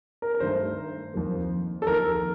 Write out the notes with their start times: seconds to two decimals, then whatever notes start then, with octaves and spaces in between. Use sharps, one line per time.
0.22 A#4
0.34 A#4
0.40 G2 D#3 A3 C5
1.14 F2 D#3 A#3
1.82 A4
1.87 F2 D#3 A#3 A#4